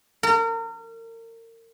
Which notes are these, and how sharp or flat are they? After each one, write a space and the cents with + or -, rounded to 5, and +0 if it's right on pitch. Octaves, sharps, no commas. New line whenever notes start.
A#4 -35